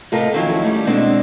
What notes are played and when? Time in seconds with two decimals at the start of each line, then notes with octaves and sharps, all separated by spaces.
0.12 A2 C3 F4 A4 A#4 D#5
0.34 D#3 F3 F#3 C#4 E4
0.62 G3 A3 C#4
0.87 B2 G#3 A3 C4 D4